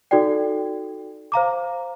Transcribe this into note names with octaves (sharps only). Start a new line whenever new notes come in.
D#4 F#4 A4 D5 G5
C5 F5 A#5 D6